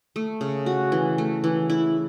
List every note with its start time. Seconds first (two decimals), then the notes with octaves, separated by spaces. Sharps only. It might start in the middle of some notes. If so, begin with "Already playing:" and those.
0.16 A3
0.41 C#3
0.66 F#4
0.92 E3
1.18 A3
1.44 E3
1.70 E4